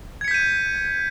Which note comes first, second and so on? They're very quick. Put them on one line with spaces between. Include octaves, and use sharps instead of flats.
G#6 C#7 B6 G6 D#7